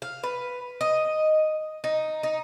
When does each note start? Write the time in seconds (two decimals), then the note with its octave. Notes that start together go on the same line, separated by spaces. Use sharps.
0.02 F5
0.23 B4
0.81 D#5
1.84 D#4
2.23 D#4